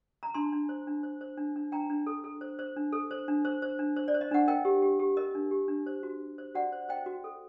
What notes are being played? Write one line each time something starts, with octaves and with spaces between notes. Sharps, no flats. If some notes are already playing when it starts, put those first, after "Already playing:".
A#5
D4 A5 C6
D4
C5
D4
C5
C5
D4
D4
D4 G5 A#5
D4
A4
A4
C5
C5
D4
A4
C5
D4
C5
C5
D4
C5
D5
C5
D#5
D4 F#5
A#4 D#5 G5
G4
G4
G4
A#4 D#5
D4
G4
D4
C5
F#4
F#4
C5
F#4 D5 F#5
C5
C5 D#5 G5
F#4
A4